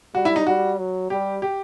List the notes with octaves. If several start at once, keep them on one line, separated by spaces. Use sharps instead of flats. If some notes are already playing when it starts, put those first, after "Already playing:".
G3 F#4
E4
D#4
G3 F#4
F#3
G3 G4
G4